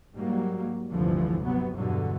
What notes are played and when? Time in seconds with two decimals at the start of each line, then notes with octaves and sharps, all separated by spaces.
0.15 G#2 F#3 G3 A#3
0.91 F1 D2 G2 D3 E3 F3
1.44 C3 F#3 B3
1.75 E2 G2 B2 D3 F#3